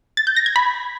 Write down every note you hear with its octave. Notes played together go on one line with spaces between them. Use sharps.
A6
G6
A#6
G#6
B5